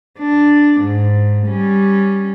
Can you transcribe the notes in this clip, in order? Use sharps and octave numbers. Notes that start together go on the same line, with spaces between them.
D4
G#2
G3 C#4